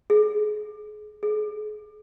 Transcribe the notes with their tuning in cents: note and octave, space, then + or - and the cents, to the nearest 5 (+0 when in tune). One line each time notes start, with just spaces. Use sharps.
G#4 +30
G#4 +35